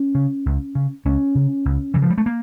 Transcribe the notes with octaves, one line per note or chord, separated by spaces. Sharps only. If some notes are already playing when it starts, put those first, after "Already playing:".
Already playing: C#4
C#3
C#2
C#3
C#2 C#4
C#3
C#2
C#3 E3
F3
G3
A3
A#3